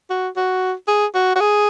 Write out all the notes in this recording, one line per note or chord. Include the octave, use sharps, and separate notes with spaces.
F#4
F#4
G#4
F#4
F#4
G#4